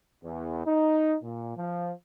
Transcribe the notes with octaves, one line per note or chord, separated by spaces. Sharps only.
E2
D#4
A#2
F3